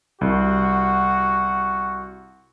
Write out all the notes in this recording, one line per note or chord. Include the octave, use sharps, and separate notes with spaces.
C2 F#4